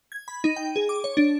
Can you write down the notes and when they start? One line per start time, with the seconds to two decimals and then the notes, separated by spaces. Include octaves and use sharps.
0.12 G#6
0.28 B5
0.44 D#4
0.56 G5
0.76 G#4
0.89 D6
1.04 C#5
1.17 D4